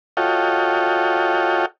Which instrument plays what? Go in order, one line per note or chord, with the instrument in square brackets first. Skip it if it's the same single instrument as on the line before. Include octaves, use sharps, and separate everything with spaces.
[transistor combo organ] F4 F#4 A4 C#5 D#5 G5